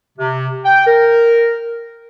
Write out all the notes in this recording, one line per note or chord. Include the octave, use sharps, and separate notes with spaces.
C3
G5
A#4